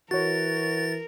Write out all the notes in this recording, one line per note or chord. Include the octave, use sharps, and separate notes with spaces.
E3 F#4 A#4 C#5 A6